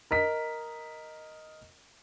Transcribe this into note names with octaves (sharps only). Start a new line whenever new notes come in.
A#4 D#5 B6